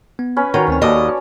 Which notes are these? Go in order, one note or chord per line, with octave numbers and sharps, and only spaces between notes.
B3
C#4 B4
D#3 F#4 C#5 F#5 A#5
D2 C4 F#5 G#5
D#2 F#4 A4 B4 D5 D#5 D6